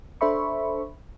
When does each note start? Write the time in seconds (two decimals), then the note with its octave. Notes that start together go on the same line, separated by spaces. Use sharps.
0.21 D4 A4 C5 E5 B5 C#6